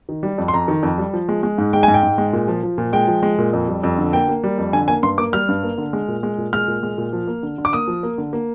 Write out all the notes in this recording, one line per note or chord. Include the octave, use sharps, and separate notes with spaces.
D#3
G3
F2
C6
F2 A#5
D#3
F2
G3
F3
G#3
G#3
G#2
G#3 G5
G#2 G#5
G5
G#2
G#3
A#2
F3
F3
A#2
G#3 G5
F3
G#3
A#2
F2
G3
F2
D3
A#3 G5
A#3
G3
F2
D3 G#5
A#3 G#5
G2 C6
A#3 D6
G3 F6
G2
A#3
D3
G#3
A#2
G#3
A#2
G#3 F6
A#2
G#3
A#2
F3
A#3
D3
D3
D6
A#3 D#6
F3
A#3
D3
A#3